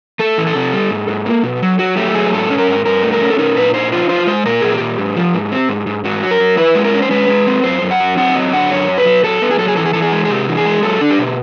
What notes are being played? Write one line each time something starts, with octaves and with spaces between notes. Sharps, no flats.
A3 A4
E3
A4
C3
G3
G#2
G#2
A#3
B2
F#3
F#3 F#4
A3 G4
F#3 G#4
G#2 A4
C#4
A#4
G#2
G2 A#4
A3
A#4
C#4
A4
D#4 A#4
A#2 B4
D#4 C5
F4 C5
F4 C5
G#3 C5
A#2 A#4
A#2 G#4
G4
A#2
G#2
F3
G#2
C4
G#2
G#2
G#2 F#4
F#3
A#4
F#3
E4 B4
G#3
A#4
C#4
C5
G#3 B4
G#3
C4
F#2 C5
F#2
F#5
F#3
C4 F#5
F#3 D#5
D3 F#5
F#2 C#5
F#3
B4
F#3
F#3 A4
B3
G#4
F#3 A4
G#4
E3 A4
G#4
E3 A4
G#4
G#3
G#4
C3 G4
E3
G#4
G#3
F#3 A4
D4
G4
B2